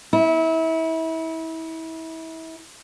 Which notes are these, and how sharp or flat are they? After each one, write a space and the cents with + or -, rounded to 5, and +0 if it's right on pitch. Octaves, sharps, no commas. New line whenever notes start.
E4 -30